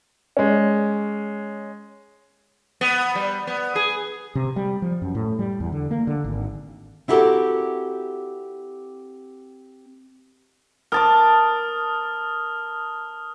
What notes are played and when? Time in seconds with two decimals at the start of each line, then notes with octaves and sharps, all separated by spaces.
0.37 G#3 C#4
2.81 B3
3.15 G3
3.47 B3
3.75 G#4
4.35 C3
4.56 G3
4.82 F3
5.02 F#2
5.15 A2
5.39 G3
5.60 E2
5.72 D3
5.91 A#3
6.07 D3
6.24 G#1
7.08 C4 E4 F#4 G4 A4 A#4
10.92 A#4 A5 D6 D#6 F6